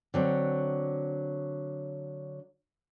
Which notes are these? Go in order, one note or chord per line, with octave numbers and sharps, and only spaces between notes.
D3 F#3 C4